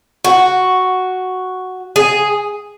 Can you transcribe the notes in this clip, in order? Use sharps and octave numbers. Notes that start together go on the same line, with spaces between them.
F#4
G#4